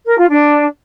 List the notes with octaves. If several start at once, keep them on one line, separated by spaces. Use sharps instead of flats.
A#4
F4
D4